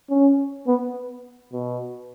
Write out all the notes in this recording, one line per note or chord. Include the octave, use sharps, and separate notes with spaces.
C#4
B3
B2